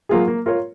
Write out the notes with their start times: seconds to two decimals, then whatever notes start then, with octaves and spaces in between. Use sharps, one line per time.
0.09 F#3 A#3 F4 G#4
0.28 A#3
0.46 F4 A#4 C#5